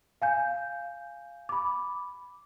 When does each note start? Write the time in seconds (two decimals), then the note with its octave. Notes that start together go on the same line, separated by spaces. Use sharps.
0.22 F5 G#5 G6
1.49 B5 D6